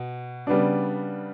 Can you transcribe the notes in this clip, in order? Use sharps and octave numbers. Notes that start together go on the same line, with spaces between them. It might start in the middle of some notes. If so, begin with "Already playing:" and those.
Already playing: B2
C#3 G3 B3 D4